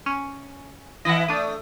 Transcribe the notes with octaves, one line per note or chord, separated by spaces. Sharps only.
C#4
E3 E4 D#5 F#5
A3 D4 D#6